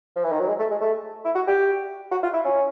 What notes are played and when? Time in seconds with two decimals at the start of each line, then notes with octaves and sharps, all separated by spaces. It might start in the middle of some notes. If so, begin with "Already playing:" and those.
0.16 F3
0.24 E3
0.32 D#3
0.40 F#3
0.48 G#3
0.59 A3
0.71 G#3
0.81 A3
1.25 E4
1.35 F#4
1.47 G4
2.11 F#4
2.23 F4
2.34 E4
2.45 C#4